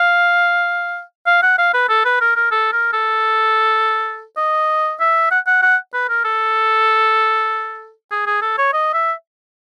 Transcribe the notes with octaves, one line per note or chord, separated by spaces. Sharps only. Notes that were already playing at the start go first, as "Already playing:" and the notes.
Already playing: F5
F5
F#5
F5
B4
A4
B4
A#4
A#4
A4
A#4
A4
D#5
E5
F#5
F#5
F#5
B4
A#4
A4
G#4
G#4
A4
C#5
D#5
E5